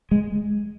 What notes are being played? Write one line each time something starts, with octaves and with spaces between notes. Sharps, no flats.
G#3